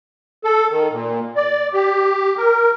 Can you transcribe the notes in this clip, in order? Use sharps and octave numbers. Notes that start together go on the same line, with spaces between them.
A4
D#3
A#2
D5
G4
A#4